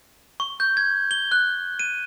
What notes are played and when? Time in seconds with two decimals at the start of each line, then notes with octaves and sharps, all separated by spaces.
0.40 C#6
0.60 G6
0.77 G#6
1.11 G7
1.32 F#6
1.79 D#7